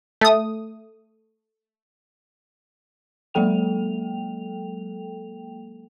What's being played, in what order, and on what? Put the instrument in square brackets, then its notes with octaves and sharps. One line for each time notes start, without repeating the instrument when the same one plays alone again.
[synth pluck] A3 D#6
[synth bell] F#3 G#3 A#3 A4 G5 F7